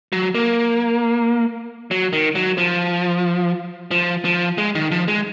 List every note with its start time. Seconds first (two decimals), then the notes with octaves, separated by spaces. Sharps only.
0.12 F#3
0.35 A#3
1.91 F#3
2.13 D#3
2.35 F#3
2.58 F3
3.91 F3
4.25 F3
4.58 G#3
4.75 D#3
4.91 F3
5.08 G#3